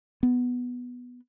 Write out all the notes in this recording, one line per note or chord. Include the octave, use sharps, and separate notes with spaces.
B3